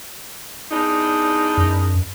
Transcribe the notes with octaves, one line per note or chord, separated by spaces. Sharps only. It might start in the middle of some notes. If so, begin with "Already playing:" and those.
E2 D4 D#4
F#2